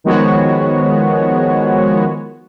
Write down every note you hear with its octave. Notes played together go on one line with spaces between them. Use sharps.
D#3 F3 G#3 B3 F#4 C#5